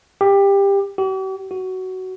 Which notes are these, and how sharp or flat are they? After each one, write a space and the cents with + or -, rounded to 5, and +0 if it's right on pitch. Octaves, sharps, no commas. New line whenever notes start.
G4 +20
G4 -45
F#4 +15